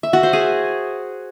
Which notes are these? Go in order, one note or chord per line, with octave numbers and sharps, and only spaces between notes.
E5
F#4
C5
G#4